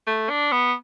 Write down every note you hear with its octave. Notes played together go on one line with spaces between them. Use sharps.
A3
D4
B3